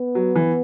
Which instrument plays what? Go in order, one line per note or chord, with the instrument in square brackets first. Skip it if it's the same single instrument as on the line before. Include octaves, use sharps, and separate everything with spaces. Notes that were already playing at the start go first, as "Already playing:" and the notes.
Already playing: [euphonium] B3
[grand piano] F#3
E3